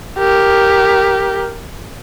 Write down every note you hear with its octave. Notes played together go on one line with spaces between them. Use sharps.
G4 A#4